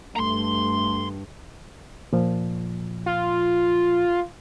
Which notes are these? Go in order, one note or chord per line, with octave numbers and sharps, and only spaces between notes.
G2 A3 A#5 C6
A#2 F3
F4